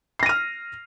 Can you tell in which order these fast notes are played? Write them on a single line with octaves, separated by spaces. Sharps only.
C7 A#6 D#7 F6